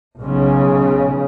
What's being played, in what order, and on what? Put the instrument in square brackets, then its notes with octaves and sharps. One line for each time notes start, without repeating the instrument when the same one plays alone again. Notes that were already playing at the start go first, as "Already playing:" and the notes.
[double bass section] B1 C#3